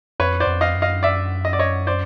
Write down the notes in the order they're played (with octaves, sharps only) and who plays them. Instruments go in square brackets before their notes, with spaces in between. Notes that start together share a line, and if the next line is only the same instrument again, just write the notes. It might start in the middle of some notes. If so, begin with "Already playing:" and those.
[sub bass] F2 [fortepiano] B4 C#5
[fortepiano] C5 D5
[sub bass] F2
[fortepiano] D#5 F5
[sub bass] F#2
[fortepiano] D#5 F5
D5 E5
D#5
D5
C#5 D#5
C5 D5